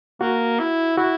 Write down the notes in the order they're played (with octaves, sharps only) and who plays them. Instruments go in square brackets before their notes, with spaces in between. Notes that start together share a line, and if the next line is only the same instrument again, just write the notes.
[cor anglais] A#3 [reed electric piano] F#4
[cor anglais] E4
[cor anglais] E4 [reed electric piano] F#4